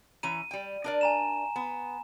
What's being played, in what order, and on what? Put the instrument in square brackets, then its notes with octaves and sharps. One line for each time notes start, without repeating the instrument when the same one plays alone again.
[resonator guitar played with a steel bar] E3 C#4 A#5 [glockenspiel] D#7
[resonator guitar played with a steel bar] G3 G5
D4 A#4 D5
[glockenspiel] G#5 A#5 E7
[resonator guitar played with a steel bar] B3